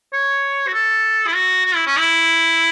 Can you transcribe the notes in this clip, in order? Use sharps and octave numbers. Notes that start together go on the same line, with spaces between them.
C#5
F#4
A4
E4
F#4
F#4
E4
C#4
E4